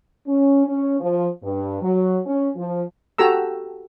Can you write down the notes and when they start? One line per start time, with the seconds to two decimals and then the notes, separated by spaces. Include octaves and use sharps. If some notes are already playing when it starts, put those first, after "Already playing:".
0.26 C#4
0.67 C#4
1.00 F3
1.43 G2
1.82 F#3
2.26 C#4
2.56 F3
3.18 F#4 G4 A4 A#5 E6